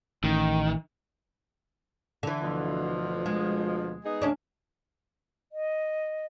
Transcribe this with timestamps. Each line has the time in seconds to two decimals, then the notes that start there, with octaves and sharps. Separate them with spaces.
0.24 A1 D#3
2.23 D3 E3
2.43 D2 B2 F3
3.26 G#3
4.05 B3 D#4 G#4
4.22 D2 C#4 D4
5.52 D#5